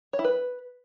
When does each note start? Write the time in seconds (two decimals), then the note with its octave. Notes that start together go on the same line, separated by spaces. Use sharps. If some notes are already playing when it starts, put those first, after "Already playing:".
0.13 C#5
0.19 E4
0.24 B4